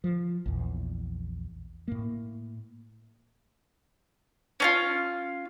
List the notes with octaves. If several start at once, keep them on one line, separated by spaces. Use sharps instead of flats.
F3
A#1 E2
A2 A#3
C#4 D4 F4